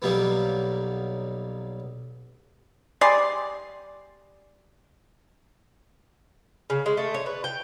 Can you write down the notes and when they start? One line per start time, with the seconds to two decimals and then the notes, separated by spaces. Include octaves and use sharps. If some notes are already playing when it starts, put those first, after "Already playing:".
0.02 B1 B2 F#3 G3 A#3 B3
3.01 G3 G#4 D5 C6
6.70 C#3
6.86 G#3
6.97 A3
7.14 C#5
7.26 B4
7.44 G5